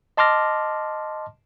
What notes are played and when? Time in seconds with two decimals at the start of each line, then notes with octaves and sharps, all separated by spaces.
0.17 D#5 A5 C6 D6 F6 A#6